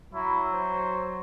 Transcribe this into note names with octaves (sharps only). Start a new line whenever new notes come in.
F#3 E4
C5